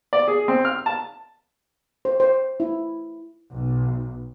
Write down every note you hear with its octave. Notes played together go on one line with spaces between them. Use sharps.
D5
G#4
C4
F6
A5
C5
C5
E4
B1